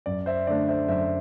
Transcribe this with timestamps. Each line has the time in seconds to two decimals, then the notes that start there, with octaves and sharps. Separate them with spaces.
0.06 F#2 D5
0.26 C5 E5
0.47 D3 A3 D4 D5
0.68 C5 E5
0.88 F#2 C5 E5